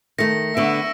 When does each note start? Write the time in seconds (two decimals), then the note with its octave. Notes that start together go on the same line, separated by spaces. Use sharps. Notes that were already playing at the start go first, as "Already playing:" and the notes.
0.18 D#3 A3 A#6 C#7
0.57 D3 B3 E5 C#6 E6 D7